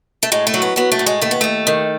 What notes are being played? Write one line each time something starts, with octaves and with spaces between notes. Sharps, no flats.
A3
A2 G#3
A3
F#3
B3
F#3 B3
A3
A2
G#3
D#2 A3
B3
D#2 A3
D#3